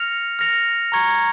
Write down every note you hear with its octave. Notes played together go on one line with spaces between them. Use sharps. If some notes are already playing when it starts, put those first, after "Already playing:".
Already playing: F6 A#6 C#7 F7
F6 A#6 C#7 F7
A#5 C#6 G#6 C#7